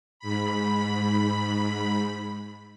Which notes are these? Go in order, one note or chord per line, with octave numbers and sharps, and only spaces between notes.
G#2 B5